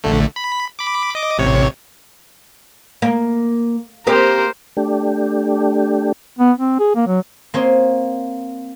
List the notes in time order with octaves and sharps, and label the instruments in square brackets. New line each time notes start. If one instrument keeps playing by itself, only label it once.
[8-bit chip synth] A#1 D3 A3
B5
B5 D6
D#5 D6
A1 C3 C#5
[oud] A#3
[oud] A#3 C4 G4 [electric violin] A#4 C5
[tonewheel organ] A3 D4 G4
[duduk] B3
C4
G#4
A#3
F#3
[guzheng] A#3 C4 C#5 D#5 C6